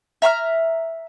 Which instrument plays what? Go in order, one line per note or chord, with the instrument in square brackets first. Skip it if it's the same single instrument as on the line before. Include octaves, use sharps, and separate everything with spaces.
[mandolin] E5 A#5 C6 F6